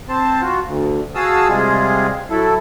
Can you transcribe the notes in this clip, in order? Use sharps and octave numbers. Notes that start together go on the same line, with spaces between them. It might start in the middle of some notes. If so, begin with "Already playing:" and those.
C4 C5 A5
F4 F#4
D2
F#4 G#4 F5 A5 D#6 E6
C3 G3 G#3 F4 G#4
F#3 E4 A4